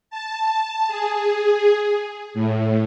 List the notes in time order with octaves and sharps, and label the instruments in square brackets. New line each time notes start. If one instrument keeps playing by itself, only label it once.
[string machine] A5
G#4
A2